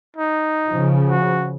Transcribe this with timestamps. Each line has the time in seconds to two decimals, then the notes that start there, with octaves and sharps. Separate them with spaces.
0.16 D#4
0.68 C#3 F3
1.09 F#4